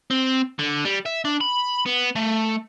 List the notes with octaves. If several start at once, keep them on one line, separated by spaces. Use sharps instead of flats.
C4
D3
G3
E5
D4
B5
B3
A3